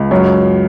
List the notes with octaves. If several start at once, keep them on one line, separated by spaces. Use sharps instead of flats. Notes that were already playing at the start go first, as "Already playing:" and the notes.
Already playing: C#2
F#2 C#5